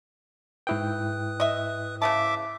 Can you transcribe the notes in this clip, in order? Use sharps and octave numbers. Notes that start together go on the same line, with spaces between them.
G#2 E4 B4 G5 D#6 F#6
D#5 E5
C#3 E3 E5 A5 D6